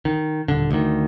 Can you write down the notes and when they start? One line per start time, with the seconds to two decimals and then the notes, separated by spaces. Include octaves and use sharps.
0.05 D#3
0.48 D#1 D3
0.71 D2 D#3